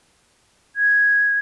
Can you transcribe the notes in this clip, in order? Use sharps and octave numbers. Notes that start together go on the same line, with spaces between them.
G#6